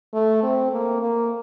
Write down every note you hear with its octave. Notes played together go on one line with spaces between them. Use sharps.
A3
C4
A#3
A#3